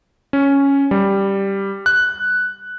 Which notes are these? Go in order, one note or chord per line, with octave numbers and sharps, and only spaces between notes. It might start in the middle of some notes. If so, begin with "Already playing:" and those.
C#4
G3
F#6